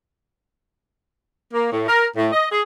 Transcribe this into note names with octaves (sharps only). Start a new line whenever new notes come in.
A#3
A2
A#4
A2
D#5
G#4